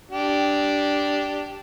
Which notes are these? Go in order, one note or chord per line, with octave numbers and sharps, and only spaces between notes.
D4 G4